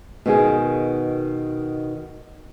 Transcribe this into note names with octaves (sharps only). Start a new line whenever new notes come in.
B2 D#3 G#4